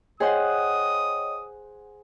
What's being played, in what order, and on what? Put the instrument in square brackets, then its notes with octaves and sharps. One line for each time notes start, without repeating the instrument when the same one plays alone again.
[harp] G#4 C5 F#5 [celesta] C#5 D#5 G5 [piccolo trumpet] D#6